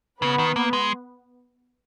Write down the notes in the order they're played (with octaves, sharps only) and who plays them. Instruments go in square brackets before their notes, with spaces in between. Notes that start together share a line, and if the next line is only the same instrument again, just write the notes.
[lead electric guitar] C#3 [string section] B3 B4
[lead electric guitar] D#3
A#3
G#3